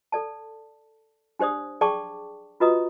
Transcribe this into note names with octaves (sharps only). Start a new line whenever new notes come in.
A4 D5 A5
D4 G4 C5 D5 D#6
G#4 D5 G5 A5 C#6 D6
F4 F#4 B4 D#5 A#5 D#6